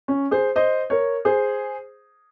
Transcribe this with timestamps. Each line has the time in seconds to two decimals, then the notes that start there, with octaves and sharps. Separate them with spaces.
0.08 C#4
0.31 G#4 C5
0.56 C5 D#5
0.90 A#4 C#5
1.25 G#4 C5